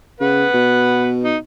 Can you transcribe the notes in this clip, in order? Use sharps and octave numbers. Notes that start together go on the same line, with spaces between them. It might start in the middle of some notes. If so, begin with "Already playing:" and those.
C#3 B4 F#5
B2
D#4